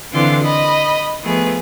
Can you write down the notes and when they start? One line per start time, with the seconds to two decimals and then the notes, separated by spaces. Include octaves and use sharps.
0.12 D3 E3 C4 F4 C6 D6
0.42 D#5 B5
1.23 F3 A3 B3 G#4 B4